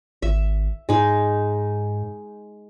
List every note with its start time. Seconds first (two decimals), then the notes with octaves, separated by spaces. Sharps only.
0.22 G#1 E5
0.89 G#2 G#3 D#4